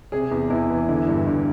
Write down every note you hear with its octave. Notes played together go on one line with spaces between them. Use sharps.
C3 G#4
E2
E2 E4
E3
D3 E4
G2
G2